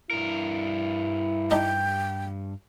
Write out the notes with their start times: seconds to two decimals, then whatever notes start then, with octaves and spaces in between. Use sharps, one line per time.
0.11 G2 E4 A#4
1.51 D4 D#4 D#5 G5